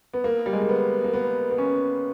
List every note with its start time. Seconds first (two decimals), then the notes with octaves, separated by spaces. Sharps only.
0.14 B3
0.24 A#3
0.46 G3
0.53 G#3
0.62 A#3
0.69 B3
1.04 A#3
1.14 B3
1.51 B3
1.58 C#4